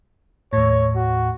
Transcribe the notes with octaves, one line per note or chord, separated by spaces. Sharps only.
D#2 A2 C#5
F#4